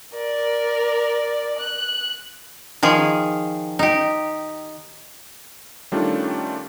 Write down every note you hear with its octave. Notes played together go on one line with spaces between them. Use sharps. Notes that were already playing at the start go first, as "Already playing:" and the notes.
A#4 D5
F#6
D#3 F3 G#4
D#4 G4
D#3 G3 A3 C#4 D4 F4